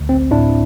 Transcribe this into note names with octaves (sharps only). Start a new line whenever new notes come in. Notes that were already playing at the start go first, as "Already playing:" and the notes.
Already playing: D2
A1 C4
A2 D4 E4